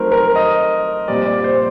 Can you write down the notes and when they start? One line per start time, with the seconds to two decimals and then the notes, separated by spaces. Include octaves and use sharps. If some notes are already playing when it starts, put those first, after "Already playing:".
Already playing: F#3 A3 C4 D#4 A#4 C5
0.12 A#4
0.35 D#5
1.08 A#2 G3 C4 D5
1.26 D5
1.44 C5